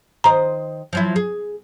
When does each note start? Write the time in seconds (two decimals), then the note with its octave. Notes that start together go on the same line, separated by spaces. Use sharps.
0.24 D#3 C5 D#5 A#5
0.93 F3 F#3 E4
1.16 G#4